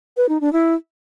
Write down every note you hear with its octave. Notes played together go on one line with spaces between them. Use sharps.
B4
D#4
D4
E4